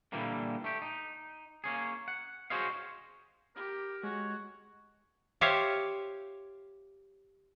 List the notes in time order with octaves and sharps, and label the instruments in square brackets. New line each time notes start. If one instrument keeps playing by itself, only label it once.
[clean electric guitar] A#2 D3 E3 G3 A#3
A3 G4
D#4
A#3 C#4 G#4
F#5
F#4 G#4 C5 C#5 D#5 F5
[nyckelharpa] G4 [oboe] A#4
[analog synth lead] G#3 [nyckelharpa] F#4 [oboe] C#5
[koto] F4 G4 C5 C#5 E5 F5